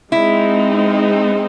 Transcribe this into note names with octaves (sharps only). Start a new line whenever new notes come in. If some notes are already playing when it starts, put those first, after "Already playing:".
G#3 C4 D#4 E4